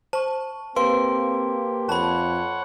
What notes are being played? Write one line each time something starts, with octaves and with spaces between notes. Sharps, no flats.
C5 A5 C#6
A#3 C4 G4 B4 F5 C6
F2 C#5 F#5 A5 B5